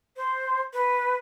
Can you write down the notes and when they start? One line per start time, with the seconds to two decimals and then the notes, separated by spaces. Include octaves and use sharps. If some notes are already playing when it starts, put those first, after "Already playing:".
0.16 C5
0.73 B4